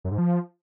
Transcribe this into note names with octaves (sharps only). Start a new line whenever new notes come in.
F#2
G#2
F3